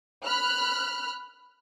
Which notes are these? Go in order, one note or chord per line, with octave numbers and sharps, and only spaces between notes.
B5 F6 F#6